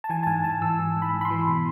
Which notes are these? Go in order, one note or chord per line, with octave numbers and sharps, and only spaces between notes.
A5
E3 G#5
A5
G#2 G#5
G#2 A5
E3 E6
E3
G#2
B5
G#2
B5
C6
E3
B2